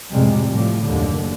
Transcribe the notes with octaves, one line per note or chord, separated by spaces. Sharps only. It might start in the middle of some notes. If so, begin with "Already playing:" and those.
A1 F2 A2 C3 G3 G#3
A2 F3 G3
F#1 D#2 D3